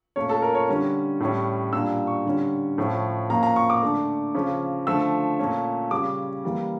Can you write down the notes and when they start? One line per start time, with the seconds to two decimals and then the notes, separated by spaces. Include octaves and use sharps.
0.16 A#2 A3 C#4 C#5
0.29 A4
0.42 A#4
0.55 C#5
0.69 D3 G3 C#4
1.20 A2 G3 C#4
1.73 A#2 G3 D4 E6
2.07 C#6
2.26 D3 G3 C#4
2.78 A2 F3 C#4
3.30 A#2 F3 A#3 C#4 A#5
3.43 A#5
3.56 C#6
3.70 D6
3.82 D3 A3 D4
4.35 C#3 F3 C#4
4.87 D3 F3 A3 E6
5.39 A#2 A3 C#4
5.91 C#3 G3 C#4 D6
6.44 E3 G3 A#3